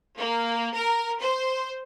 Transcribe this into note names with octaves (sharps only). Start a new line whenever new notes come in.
A#3
A#4
C5